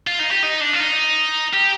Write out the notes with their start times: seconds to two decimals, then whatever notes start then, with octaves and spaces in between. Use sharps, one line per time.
0.07 F4
0.20 D#4
0.31 G4
0.43 D#4
0.61 D4
0.74 F4
0.81 D#4
1.53 G4